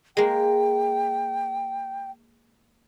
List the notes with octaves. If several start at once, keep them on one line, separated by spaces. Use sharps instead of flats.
G#3 A#3 G5